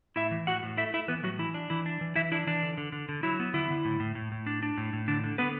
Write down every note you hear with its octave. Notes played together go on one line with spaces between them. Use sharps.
A2 E4 E5
E3
A2 F#4 F#5
A2
A3 E4 E5
A3 E4 E5
E3 B3 B4
A2 F#3 F#4
E3 E4
D4
E3 E4
D4
E3
E3 E4 E5
D4 E4
E3 D4
D3
D3
D3
D3
F#3 E4
B3
D3 E4
D3
A2
A2
A2
A2
D4
D4
A2
A2
D3 D4
D3
D3 B3 B4